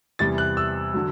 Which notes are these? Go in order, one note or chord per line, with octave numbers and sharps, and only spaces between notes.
E2 C3 E3 G3 A6
F#6
E6
D3 F#3